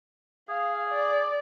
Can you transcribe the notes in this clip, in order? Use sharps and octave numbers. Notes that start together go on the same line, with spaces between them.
G#4 F5
D5